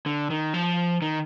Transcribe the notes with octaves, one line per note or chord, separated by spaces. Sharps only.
D3
D#3
F3
D#3